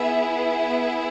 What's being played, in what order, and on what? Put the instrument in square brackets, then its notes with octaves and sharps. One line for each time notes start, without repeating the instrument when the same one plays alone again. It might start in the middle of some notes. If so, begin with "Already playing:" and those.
Already playing: [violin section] B3 E4 G#4 E5